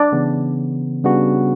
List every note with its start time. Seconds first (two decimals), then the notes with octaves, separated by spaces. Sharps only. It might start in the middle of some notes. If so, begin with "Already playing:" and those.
Already playing: D4 D5
0.12 C#3 E3 B3
1.04 C#3 G3 B3 D4 F#4